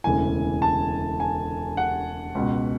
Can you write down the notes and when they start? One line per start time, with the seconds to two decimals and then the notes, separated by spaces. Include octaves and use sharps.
0.04 E1 D2 C#3 E3 G#5
0.62 A5
1.20 G#5
1.77 F#5
2.35 C#2 B2